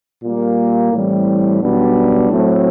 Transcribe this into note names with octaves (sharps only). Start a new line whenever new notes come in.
A#2 G3 A#3
A2 E3 G3 C4
B1 B2 G3 B3 D4
A2 F#3 A3 C4